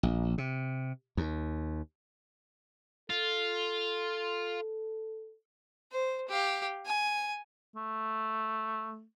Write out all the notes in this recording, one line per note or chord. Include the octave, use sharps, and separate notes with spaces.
A#1
C3
D#2
F4 A4
C5
G4 F5
G#5
A3